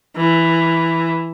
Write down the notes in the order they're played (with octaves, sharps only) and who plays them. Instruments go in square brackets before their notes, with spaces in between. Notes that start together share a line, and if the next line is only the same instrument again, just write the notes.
[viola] E3